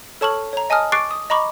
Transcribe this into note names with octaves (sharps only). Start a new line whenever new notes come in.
A4 C#5 A5 C#6 F6 F#7
C#5 A#5
D#5 G#5 A5 D#6 F6
C#6 D6 F#6 A6 C7 D7
D#6
D#5 A#5 B5 C#6 D6